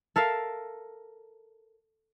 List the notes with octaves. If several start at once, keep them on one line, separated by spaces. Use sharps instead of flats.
A4 A#4 E5 F5